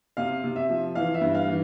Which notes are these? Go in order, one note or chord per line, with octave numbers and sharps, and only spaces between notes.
C3 F5
C3
E5
F3
E3 F5
E5
G2
F5
E3